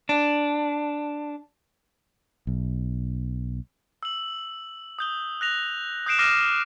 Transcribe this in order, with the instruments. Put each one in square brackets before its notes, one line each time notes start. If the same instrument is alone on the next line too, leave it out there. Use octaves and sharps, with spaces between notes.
[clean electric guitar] D4
[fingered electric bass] B1
[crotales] E6 F#7
D#6 G6 G7
F#6 A#6 F7
D#6 F#6 G6 C7 D7 E7
D6 F6 A#6 C7 D#7 E7